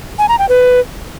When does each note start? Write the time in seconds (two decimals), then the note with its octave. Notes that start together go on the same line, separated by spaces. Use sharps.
0.19 G#5
0.29 A#5
0.39 G5
0.49 B4